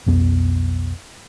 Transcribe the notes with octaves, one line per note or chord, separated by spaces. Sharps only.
B1 F2 B3